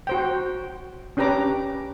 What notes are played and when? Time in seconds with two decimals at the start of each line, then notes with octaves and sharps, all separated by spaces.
0.07 F#4 C5 G5
1.17 C#4 D4 G4 B4 A#5 D6